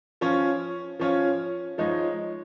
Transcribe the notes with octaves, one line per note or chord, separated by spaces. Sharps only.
F3 C#4 F4 C#5
F3 C#4 F4 C#5
F3 G#3 D#4 C#5